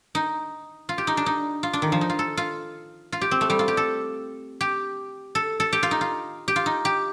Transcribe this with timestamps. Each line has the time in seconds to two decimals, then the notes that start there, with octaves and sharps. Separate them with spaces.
0.15 D#4
0.89 F4
0.98 G4
1.07 D#4
1.17 D4
1.26 D#4
1.63 F4
1.73 D4
1.82 D#3
1.92 F3
2.01 D#4
2.10 F4
2.19 A4
2.37 F4
3.12 F4
3.21 G4
3.31 C4
3.41 A3
3.50 G3
3.59 F4
3.68 G4
3.77 A4
4.61 G4
5.35 A4
5.60 A4
5.73 G4
5.83 F4
5.91 D#4
6.01 F4
6.48 G4
6.56 F4
6.66 D#4
6.85 G4